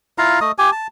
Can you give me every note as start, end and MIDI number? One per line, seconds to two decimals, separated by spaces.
0.18 0.40 64
0.18 0.40 65
0.18 0.40 77
0.18 0.40 82
0.41 0.52 57
0.41 0.52 75
0.41 0.52 87
0.58 0.71 67
0.58 0.71 80
0.72 0.87 81